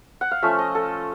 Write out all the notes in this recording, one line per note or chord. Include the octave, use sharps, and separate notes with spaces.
F#5
F5
F3 A3 C#4 E5
D#5
A4